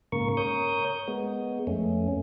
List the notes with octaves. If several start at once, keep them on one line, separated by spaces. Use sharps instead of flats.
G#2 C#3 A#3 A#4 C#6
A#4 C#5 D#6 G6
G#3 B3
F2 A3 C#4